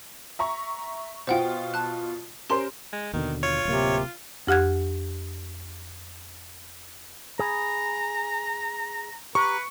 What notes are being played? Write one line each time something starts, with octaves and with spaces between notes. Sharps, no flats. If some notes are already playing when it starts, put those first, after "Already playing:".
E5 A#5 C#6
B2 F4 C5 F#5 G5
A5 F#6
C#4 G4 A#4 C5 C6
G#3
D#2 B2 D3 D#3
F4 C#5
D1 C3 A#3
F2 G4 F#5 F#6 G#6
G#4 G#5 A#5 B5
G4 B4 A#5 C#6